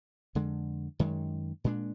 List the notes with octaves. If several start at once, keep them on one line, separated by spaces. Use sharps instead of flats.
F2 D3 G#3
F#2 D#3 G#3
A#2 G#3 D4